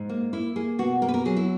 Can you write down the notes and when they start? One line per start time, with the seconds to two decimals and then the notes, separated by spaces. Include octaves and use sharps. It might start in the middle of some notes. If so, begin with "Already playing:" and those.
Already playing: G#2
0.09 A#3
0.33 A#3 E4
0.56 A#3 G#4
0.79 B2 F#4
1.02 A#3 A#4
1.08 B4
1.14 A#4
1.25 F#3 G#4
1.37 E4